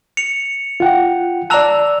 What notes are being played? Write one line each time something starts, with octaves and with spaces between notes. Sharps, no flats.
C#7 F7
F4 F#5 G5
D5 A5 A#5 E6 F#6 F7